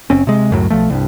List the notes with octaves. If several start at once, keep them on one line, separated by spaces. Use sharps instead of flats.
F#1 C4 C#4
C3 G#3
C#2 F#2 A2 F#3
B1 F3 A3
C2 G2